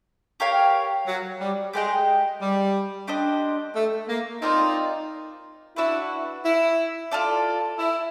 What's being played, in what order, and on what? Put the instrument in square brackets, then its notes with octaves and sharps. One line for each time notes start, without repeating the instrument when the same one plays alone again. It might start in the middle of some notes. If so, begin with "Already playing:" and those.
[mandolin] G4 A#4 C#5 F5
[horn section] F#3
G3
[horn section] G#3 [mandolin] G4 B4 D#5 G5
[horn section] G3
[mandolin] D4 G4 C5 D#5
[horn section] A3
A#3
[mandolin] C4 F4 A#4 D5 [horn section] D#4
[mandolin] D4 F#4 B4 [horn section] E4
[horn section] E4
[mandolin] F4 A4 D5
[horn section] E4